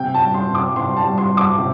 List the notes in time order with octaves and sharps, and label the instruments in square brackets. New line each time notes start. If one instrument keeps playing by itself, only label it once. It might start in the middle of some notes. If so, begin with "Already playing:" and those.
Already playing: [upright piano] C3 G5
A5
G3
C6
C3
D6
C3 C6
A5
G3
C6
G3
D6
C3